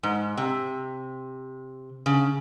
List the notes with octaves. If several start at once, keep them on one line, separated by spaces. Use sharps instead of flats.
G#2
C3
C#3